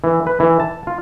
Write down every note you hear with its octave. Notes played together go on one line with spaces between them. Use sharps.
E3
B4
E3
A5
F4